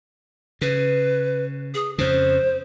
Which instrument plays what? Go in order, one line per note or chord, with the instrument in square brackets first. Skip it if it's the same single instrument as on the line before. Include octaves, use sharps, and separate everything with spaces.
[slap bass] C#3 [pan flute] B4
[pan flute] G#4
[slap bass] F2 C#3 [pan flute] C5